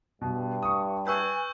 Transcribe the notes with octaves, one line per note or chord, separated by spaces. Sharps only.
G2 B2
C#6 D#6
B4 G#5 C#6 E6 G6